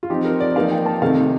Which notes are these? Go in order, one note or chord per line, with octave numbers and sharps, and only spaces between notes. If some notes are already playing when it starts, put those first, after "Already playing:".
F4
F3 C4 D#4 G4
A#4
D5
F3 A#3 D#4 F5
G5
A5
C3 D#3 A3 D#4 F5